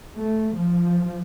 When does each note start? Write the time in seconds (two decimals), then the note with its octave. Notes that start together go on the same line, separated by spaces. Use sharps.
0.15 A3
0.56 F3